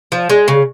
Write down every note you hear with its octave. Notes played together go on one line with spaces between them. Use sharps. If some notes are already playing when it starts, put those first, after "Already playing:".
F3
G#3
C#3